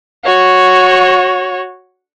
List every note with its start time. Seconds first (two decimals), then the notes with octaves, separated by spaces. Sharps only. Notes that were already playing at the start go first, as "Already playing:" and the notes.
0.24 F#4 C#5